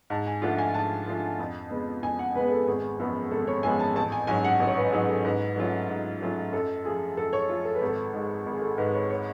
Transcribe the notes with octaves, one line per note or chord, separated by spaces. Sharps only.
G#2 A5
G#5
F3 A3 D4 F4 F#5
G#5
G#2 A5
F3 A3 D4 F4
F2
C#3 G#3 B3
F2 G#5
F#5
C#3 G#3 B3 B4
G#4
A4
G#1 G#4
F#2 F3 G#3 B3
G#1 A4
C#5
F#2 F3 G#3 B3 G#5
A5
A1 A5
G#5
G#2 F#3 C#4 F#4 G#5
F#5
A1
C#5
B4
G#2 F#3 C#4 F#4 G#4
A4
G#2 B4
F#3 A3 C#4 F4
G#2
F#3 A3 C#4 F4
F#2 A4
F3 A3 F4 G#4
F#2 A4
C#5
F3 A3 F4
A4
B4
G#1 A4
G#2 G#3
G#1
G#4
A4
G#2 G#3 B4
C#5
C#5